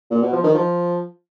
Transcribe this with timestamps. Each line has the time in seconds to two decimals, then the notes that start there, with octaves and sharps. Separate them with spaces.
0.11 A#2
0.22 B2
0.33 F3
0.44 D#3
0.55 F3